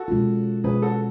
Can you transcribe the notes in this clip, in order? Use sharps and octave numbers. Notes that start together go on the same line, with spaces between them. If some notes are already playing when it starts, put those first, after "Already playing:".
Already playing: F#4 A4
B2 G#3 C#4 F4
B2 G#3 C#4 F4 G#4 B4
F#4 A4